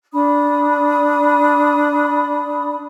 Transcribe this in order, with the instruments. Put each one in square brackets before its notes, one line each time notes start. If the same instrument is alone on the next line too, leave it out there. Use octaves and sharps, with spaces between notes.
[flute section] D4 B5 D#6